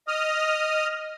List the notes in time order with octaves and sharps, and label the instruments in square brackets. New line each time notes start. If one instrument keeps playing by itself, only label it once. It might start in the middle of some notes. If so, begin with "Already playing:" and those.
[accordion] D#5 D#6 F6